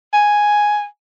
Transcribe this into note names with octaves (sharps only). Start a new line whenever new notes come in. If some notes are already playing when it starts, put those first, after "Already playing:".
G#5